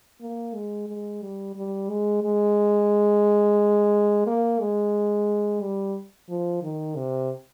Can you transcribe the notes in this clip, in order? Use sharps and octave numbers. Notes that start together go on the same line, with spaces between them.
A#3
G#3
G#3
G3
G3
G#3
G#3
A#3
G#3
G3
F3
D#3
C3